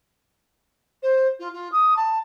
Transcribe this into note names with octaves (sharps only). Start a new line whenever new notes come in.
C5
F4
F4
D#6
A5